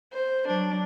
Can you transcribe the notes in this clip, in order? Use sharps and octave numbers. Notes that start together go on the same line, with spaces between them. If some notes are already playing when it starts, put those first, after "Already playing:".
C5
F#3 D4